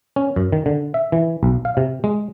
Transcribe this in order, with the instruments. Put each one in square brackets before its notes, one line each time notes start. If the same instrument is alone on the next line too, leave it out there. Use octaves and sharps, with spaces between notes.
[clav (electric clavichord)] C#4
F#2
D#3
D3
E5
E3
B1
F5
C3
G#3